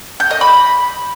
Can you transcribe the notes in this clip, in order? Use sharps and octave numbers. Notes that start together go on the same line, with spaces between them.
G6
D#5
B5